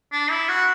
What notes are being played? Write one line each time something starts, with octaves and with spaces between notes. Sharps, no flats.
D4
E4
F#4